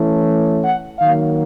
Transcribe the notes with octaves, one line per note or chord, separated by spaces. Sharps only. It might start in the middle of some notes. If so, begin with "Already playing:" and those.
Already playing: E3 A3 C#4
F#5
D#3 F#3 A#3 F5